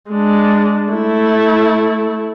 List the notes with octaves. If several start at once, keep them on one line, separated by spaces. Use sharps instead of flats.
G#3 D4
A3 E4